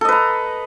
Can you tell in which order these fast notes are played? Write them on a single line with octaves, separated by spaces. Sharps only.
A4 D#5 B4 A#5